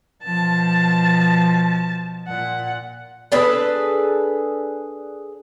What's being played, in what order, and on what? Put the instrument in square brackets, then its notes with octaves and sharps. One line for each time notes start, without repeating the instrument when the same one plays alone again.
[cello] B2 F3 [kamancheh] A5
[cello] A#2 [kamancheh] F#5
[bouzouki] D4 G#4 A4 B4